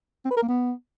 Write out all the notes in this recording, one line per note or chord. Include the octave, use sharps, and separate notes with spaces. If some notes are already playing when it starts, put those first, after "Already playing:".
C4
B4
A#4
A#3
B3